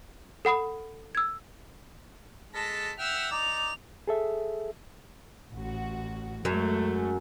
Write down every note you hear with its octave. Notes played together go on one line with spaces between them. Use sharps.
A4 F#5 B5 D#6
E6 G#6
G#3 A4 A5 A#6 B6
E5 F#5 G5 E6 F6
D#4 D5 F7
G#4 A4 E5
A1 F#4
F#2 G#3 A3